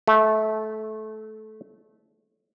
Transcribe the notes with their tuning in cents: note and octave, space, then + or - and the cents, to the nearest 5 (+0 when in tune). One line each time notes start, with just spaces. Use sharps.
A3 -20